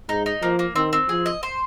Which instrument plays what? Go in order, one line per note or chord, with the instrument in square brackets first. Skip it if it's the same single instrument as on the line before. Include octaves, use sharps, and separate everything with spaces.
[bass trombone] G#2 [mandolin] D#4
[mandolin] D#4
[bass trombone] F3 [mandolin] A#3
[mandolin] A#3
[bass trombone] D#3 [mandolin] C4
[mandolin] C4
[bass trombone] F3 [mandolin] G#4
[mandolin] D#5
C5